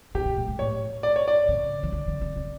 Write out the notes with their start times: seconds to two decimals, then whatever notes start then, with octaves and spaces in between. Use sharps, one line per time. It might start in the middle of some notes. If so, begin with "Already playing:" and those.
0.15 C3 G4
0.25 B2
0.37 A2
0.48 G#2
0.59 A2 C#5
1.03 D5
1.16 C#5
1.28 D5
1.48 C#3
1.83 D#3
1.92 D3
2.07 D3
2.21 C#3
2.36 C#3